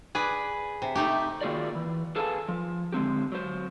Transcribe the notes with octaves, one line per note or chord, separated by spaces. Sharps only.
G#4 B4 D5
C3
A3 D#4 G4
D#3 A#3 F4 F#4 G#4 D5
E3
G#4 A4 B4 F5 G#5 A5
F3
D3 G#3 C4 G4
F#3 C5